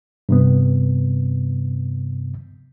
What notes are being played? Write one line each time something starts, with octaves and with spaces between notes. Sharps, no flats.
G2 C3 B3